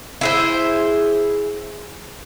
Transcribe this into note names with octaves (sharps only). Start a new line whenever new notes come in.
E4 G#4 C5